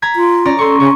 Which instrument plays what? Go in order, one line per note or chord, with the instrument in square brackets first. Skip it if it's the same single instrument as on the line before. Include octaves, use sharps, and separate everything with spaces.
[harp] A#5 G#6 B6
[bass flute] F4
[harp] C#4 D5 A#5
[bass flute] A4 [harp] C6 C#6
[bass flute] C#3 [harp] C#6